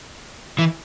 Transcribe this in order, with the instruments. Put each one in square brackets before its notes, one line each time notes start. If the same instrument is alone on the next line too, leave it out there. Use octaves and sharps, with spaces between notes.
[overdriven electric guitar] E3